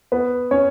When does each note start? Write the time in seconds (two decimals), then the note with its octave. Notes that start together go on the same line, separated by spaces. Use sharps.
0.12 B3 B4
0.51 C#4 C#5